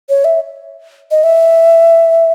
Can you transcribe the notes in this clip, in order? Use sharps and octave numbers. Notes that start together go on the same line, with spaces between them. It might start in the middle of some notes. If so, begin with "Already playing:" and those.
C#5
E5
D#5
E5